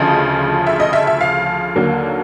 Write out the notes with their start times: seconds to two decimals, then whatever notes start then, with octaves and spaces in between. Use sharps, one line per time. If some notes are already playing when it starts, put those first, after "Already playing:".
Already playing: D2 C#3 F3 D#5
0.67 E5
0.80 D#5
0.93 E5
1.07 E5
1.21 F5
1.76 D#2 D3 F#3 A#3